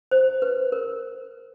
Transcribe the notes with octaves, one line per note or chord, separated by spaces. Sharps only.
C5
B4
A#4